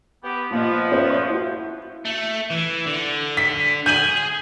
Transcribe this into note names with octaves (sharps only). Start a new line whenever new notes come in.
B3 G4
A#2 F3 B3 D#5
C#4 C5 E5
C#6 G6
E4 F#4
A3
E3
D3
B6
G#4 G6 D#7 F#7